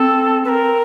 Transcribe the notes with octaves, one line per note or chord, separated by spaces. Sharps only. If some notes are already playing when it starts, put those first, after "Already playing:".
Already playing: C4 A4
C4 A#4 B4